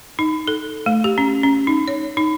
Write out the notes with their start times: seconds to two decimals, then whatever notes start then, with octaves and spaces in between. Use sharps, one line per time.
0.19 D#4
0.48 A4
0.86 A3
1.04 G4
1.18 C#4
1.43 C#4
1.67 D#4
1.88 C#5
2.17 D#4